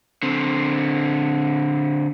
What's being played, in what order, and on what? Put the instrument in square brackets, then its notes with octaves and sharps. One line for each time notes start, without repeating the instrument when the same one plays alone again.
[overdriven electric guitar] D3 C4